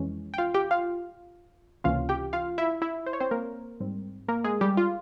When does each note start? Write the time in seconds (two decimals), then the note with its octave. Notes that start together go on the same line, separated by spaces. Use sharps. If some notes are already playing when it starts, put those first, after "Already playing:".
Already playing: F2 E3 G#3 C#4
0.34 G5
0.38 F4 F5
0.54 G4 G5
0.71 F4 F5
1.84 C#2 C3 E3 A#3 C#4 F4 F5
2.09 G4 G5
2.33 F4 F5
2.58 E4 E5
2.82 E4 E5
3.06 C5
3.13 C#5
3.20 C4 C5
3.31 A#3 A#4
3.80 G#2 G3 C4
4.28 A#3 A#4
4.44 G#3 G#4
4.61 G3 G4
4.77 F4